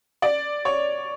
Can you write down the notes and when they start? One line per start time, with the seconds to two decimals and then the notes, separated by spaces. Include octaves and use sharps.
0.22 D5
0.65 C#5